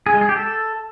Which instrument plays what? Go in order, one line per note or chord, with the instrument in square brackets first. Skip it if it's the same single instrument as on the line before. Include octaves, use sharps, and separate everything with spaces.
[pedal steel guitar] G#4
G#3
G#4
G4
A4